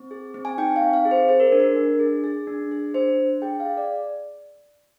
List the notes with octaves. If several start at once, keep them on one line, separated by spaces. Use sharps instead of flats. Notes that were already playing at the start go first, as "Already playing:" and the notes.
Already playing: C4
G#4
C4
G#5
D#4 G5
F5
C4
F5
G#4
C5
G#4 C5
A#4
D4
A#4
D4
G#4
G#4
D4
G#4
D4 C5
D4
G#4 G5
F5
G#4
D5